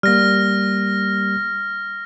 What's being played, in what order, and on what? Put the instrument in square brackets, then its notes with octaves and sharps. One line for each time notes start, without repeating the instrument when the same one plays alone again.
[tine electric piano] G3 A#3 [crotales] F6 A#6